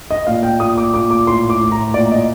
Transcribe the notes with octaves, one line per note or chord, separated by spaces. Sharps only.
D#5
A#2 F5
G5
A#2 D#6
D6
A#2 D6
D6
A2 C6
D6
A2
A#5
A#2 D5
D#5